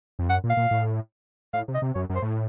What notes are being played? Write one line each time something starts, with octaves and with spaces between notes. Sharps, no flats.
F2
F#2 F#5
A#2
F5
A#2
A2
A2 F5
C3
D#5
C3
F#2 C#5
F#2
C5
A2